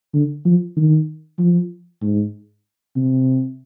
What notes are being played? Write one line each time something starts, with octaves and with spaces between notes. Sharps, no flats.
D3
F3
D#3
F3
G#2
C3